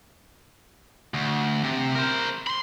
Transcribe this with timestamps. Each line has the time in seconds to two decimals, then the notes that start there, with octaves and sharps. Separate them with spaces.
1.14 D2
1.64 C3
1.95 A#4 C5
2.47 B5 C6